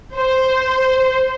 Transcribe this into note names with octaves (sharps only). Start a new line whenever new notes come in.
C5